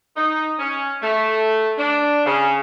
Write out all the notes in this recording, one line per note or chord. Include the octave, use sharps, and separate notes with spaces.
D#4
C#4
A3
D4
C#3